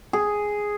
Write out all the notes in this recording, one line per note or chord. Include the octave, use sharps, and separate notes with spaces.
G#4